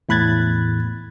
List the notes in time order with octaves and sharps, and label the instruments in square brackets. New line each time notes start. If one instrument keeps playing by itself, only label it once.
[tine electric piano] E2 A2 B5 F#6 G#6 A6